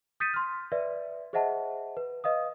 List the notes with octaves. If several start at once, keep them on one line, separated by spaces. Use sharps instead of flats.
D#6 G6 A6 B6 C#7 D#7
C6 F6
B4 D5 E5
G#4 C5 D#5 E5 F#5 A5
B4
B4 D#5 F5 D#6